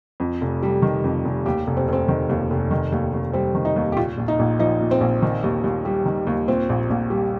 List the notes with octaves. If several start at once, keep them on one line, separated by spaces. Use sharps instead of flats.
F2
F1
G3
D#3
F2
F1
D#2 G4
F1
C4
F1 C4
D#3
D#2
F1
D#3
D#2
D#2
G3 C4
D#3
D#4
D#2
G4
A#2 F4
A#1
D#4
A#1
F3 D#4
A#2
C4
A#1
D#3
D#2
D#2
G3
D#3
D#2
A#2 C4
A#1
A#1
G3